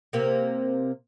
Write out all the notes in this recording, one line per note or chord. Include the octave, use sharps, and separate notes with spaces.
C3 A#3